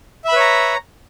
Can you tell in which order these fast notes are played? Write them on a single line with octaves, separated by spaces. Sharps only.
E5 B5 B4 C#5 A#5